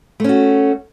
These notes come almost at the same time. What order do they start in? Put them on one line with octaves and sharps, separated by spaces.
A3 C#4 F#4